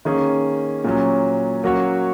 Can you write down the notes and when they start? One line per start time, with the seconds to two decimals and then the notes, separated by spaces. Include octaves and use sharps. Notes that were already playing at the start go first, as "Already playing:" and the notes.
0.05 D#3 A#3 C#4 G#4
0.84 A#2 F#3 C#4
1.63 F#3 A#3 C#4 F#4 C#5